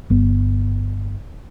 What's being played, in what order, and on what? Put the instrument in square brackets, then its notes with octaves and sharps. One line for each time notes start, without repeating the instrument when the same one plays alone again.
[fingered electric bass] G1 B3